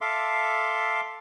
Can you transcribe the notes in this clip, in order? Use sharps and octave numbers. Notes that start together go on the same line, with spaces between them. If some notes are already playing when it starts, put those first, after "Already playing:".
A4 E5 F5 C6 D6